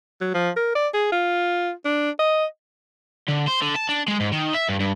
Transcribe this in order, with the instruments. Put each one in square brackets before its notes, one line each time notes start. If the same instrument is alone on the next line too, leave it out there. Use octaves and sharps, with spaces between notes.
[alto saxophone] F#3
F3
A#4
D5
G#4
F4
D4
D#5
[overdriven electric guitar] D3
C5
D3
A5
D4
G#3
G#2
D#3
E5
G2
G2